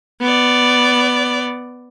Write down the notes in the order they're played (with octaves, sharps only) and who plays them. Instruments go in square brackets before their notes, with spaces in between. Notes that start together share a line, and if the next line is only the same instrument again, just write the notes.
[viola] B3 D5